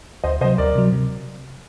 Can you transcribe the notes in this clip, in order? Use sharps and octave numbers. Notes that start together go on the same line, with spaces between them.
D2 C5 D#5
C3 F#3 C5 D#5
D2 A#4 D5
C3 F#3
C3